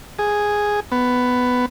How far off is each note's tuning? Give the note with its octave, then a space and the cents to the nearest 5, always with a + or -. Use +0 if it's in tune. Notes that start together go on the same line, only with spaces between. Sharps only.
G#4 +0
B3 +10